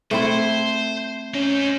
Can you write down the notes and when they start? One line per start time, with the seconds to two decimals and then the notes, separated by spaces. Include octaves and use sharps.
0.11 A3 C4 E4 C5
1.34 C#4 D#4 C5